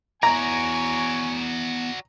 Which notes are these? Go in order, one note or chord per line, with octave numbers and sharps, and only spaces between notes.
B3 E4 F#4 C#5 D5 E5 G#5 A#5